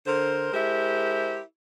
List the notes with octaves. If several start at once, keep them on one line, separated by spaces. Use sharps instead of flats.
D3 A#4 C5
G#3 E4 G4 A#4 C5